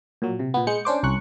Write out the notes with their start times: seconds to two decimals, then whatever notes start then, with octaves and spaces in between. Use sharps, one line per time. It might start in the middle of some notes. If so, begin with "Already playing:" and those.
0.22 A#2 F#3
0.39 C3
0.54 A#2 B3
0.67 G#3 G6 C#7
0.85 C#4 D4 C5 D6
1.03 C2 C#4 C#6 F#6